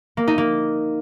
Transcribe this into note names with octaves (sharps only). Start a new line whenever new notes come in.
A#3
D#4
A#3